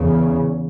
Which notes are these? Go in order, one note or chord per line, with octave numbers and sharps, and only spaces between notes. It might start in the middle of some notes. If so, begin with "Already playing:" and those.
Already playing: E2 C#3